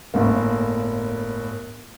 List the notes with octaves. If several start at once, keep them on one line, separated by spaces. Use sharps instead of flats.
G1 A2 A#3